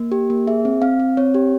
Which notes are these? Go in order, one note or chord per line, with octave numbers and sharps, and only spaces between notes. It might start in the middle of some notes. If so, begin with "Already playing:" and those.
Already playing: A#3
G4
A#3
G#4 E5
C4
C4 F5
C4
C4 C#5
G4